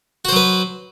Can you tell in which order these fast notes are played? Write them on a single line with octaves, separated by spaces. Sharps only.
F#4 C5 F#3 B4